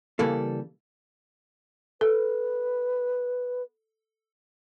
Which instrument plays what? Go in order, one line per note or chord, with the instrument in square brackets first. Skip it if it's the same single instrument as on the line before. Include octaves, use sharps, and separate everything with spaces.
[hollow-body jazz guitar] C#3 E3 G3 A#3 A4
[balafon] A4 [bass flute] B4